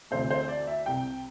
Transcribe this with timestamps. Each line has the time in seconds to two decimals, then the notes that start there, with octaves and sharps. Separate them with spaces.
0.11 D2 C3 E3 A3 C5
0.30 C5
0.48 D5
0.67 E5
0.86 C2 C3 G3 G5